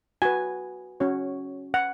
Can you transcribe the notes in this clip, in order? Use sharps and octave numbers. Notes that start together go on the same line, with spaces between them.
F#4 B4 G#5
C#4 F#4 C#5
F#5